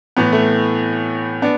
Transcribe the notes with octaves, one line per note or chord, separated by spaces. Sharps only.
A2 E3 B3
A3
B3 D4